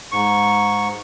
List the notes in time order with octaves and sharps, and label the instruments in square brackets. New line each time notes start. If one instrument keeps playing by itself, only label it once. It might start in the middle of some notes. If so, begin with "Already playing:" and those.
[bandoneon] G#2 C#6